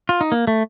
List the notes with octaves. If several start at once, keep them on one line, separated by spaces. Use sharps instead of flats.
F4
D#4
A#3
A3